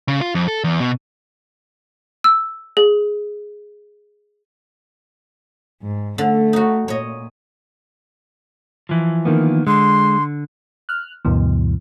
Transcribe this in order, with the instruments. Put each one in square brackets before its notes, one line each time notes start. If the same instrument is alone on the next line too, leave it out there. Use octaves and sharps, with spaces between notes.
[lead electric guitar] C#3
F4
F2
A4
E2
B2
[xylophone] E6
G#4
[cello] G#2
[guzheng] D3 [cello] A3
[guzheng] D#4 F#4
[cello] A#2 [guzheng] C#5 D#5
[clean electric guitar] E3 F3
[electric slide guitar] D#3 A#3 B3
[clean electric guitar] D3 [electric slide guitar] G#3 [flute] C6
[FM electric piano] F6 F#6
D2 G2 B2 E3